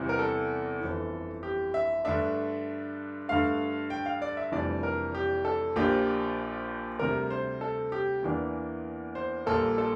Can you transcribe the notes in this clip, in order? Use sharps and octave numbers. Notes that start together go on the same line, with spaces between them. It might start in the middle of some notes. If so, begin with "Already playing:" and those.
Already playing: E2 C3 E3 G3 C4
A#4
A4
G1 F2 E3
G4
E5
G2 D3 A3 D4 E5
G2 D3 A3 F5
G5
F5
D5
E5
F1 F2 E3 G3 D4 D5
A#4
G4
A4
A#1 A#2 F3 A#3 D4 G4
D2 C3 G3 A#4
C5
A4
G4
E2 E3 A#3 D4
C5
A#1 A#2 G3 A#3 A4
A4